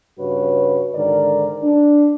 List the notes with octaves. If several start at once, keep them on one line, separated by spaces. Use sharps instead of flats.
G2 C#3 F#4 B4 C#5
G#2 D3 D#3 A#4 D5
D4